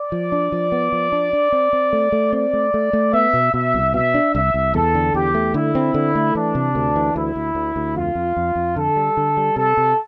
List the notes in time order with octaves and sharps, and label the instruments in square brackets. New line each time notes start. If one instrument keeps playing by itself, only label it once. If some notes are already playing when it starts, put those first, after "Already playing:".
Already playing: [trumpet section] D5
[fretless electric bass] F3
D4
F3
B3
F3
D4
D4
C4
C4
A3
A3
[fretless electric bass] C4 [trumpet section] D5
[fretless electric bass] A3
A3
A3
[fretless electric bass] B3 [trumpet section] E5
[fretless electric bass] B2
[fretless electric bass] B2 [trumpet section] E5
[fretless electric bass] C2
[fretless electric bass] B2 [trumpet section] E5
[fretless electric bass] D4
[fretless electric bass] C2 [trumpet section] E5
[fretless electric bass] C2
[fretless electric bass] E2 [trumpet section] A4
[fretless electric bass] D3
[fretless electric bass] E2 [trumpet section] G4
[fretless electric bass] A3
[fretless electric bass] D3 [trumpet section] E4
[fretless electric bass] C4
D3
A3
[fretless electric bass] E3 [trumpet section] D4
[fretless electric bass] C3
D2
E3
[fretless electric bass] D2 [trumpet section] E4
[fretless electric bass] D2
D2
D2
[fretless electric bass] F2 [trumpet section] F4
[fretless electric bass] F2
F2
F2
[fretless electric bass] D3 [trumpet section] A4
[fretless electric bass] G3
D3
G3
[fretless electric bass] C3 [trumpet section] A4
[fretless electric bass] C3